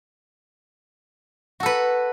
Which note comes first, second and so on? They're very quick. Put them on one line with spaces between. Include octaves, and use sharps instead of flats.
F#4 A4 B4